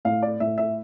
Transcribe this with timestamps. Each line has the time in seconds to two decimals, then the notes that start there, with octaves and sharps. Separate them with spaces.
0.05 A2 F5
0.22 D5
0.40 A2 E5
0.58 E5